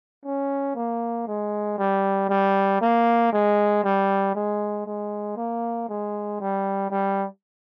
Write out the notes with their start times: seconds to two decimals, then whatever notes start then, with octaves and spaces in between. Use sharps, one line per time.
0.25 C#4
0.75 A#3
1.27 G#3
1.78 G3
2.29 G3
2.81 A#3
3.32 G#3
3.84 G3
4.35 G#3
4.86 G#3
5.36 A#3
5.88 G#3
6.40 G3
6.90 G3